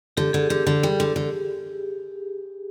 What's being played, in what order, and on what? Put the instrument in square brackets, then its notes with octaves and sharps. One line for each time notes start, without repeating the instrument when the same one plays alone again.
[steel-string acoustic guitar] D3 [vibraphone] G4
[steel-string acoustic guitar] D3 [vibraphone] G#4
[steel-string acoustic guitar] D3 [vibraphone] G4
[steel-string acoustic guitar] D3
G3
D3
D3